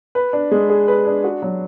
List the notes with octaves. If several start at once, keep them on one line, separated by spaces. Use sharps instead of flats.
B4
D4
G#3
G#4
B4
D4
F#4
F#3